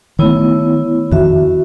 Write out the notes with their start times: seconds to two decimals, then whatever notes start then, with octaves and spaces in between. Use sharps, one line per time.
0.19 D#3 A3 B3 E4 C#5
1.12 F2 D#3 F#4 E5